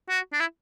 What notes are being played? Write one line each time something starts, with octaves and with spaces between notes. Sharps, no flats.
F#4
D4
E4